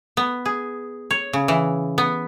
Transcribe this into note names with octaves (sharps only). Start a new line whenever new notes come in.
B3
G#4
C#5
C#3
E3
B3